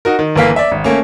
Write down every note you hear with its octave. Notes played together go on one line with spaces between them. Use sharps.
D#4 F#4 A#4
D#3
G1 E3 A#3 F5 B6
D5 E5
G#1
A3 A#3 C#4